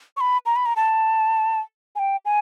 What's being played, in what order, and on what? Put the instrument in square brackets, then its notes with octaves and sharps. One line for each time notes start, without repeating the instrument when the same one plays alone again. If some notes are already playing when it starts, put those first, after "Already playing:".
[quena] C#6
B5
A#5
B5
A#5
A5
G#5
G5
G#5